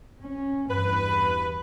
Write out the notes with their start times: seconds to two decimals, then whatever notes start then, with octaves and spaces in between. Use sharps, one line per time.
0.20 C#4
0.70 E2 G2 B4